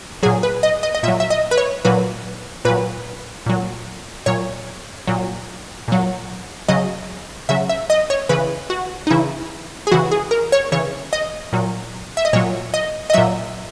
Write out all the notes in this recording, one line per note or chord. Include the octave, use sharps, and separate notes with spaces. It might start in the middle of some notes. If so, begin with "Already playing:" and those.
A#2 F#3 G#4
B4
D#5
D#5
D#5
A#2 F#3 E5
E5
D#5
B4
C#5
A#2 F#3 B4
A#2 F#3 B4
A#2 F#3
A#2 F#3 C#5
A#2 F#3
A#2 F#3
C#3 F#3 D#5
C#3 F#3 E5
E5
D#5
C#5
C#3 E3 B4
F#4
D#4
C#3 E3 E4
G#4
C#3 E3 F#4
G#4
A#4
C#5
C#3 E3 C#5
D#5
A#2 F#3
E5
D#5
A#2 F#3 C#5
D#5
D#5
A#2 F#3 E5